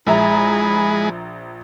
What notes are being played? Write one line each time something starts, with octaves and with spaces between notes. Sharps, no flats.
A#1 G#3 E4 G#4 E5 A#5 B5